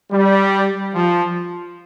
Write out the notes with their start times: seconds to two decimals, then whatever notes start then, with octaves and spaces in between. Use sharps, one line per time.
0.11 G3
0.95 F3